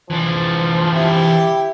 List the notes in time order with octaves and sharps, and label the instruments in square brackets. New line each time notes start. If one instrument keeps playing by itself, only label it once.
[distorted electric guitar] E3 D4 [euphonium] F3
[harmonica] E4 G4